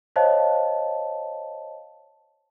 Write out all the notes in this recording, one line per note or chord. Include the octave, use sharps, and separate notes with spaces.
C5 C#5 D#5 F5 A5